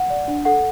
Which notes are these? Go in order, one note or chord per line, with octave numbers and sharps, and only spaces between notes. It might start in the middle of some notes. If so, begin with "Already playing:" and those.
Already playing: F#5
D5
D4
A4 F#5